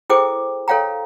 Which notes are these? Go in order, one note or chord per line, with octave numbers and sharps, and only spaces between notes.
E4 G#4 A4 C5 G5 D6
A4 C#5 F5 G5 A#5